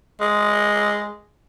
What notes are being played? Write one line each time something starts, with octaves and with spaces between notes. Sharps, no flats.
G#3